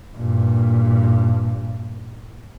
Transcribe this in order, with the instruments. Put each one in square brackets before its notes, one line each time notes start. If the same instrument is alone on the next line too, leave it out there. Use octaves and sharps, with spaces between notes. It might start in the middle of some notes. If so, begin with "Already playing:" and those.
[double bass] G2 A#2